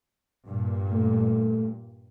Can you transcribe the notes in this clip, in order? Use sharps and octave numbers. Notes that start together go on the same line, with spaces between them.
G2 A#2
A3